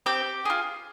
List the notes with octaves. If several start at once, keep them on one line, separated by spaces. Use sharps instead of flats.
C4 G4 G5
F4 G#4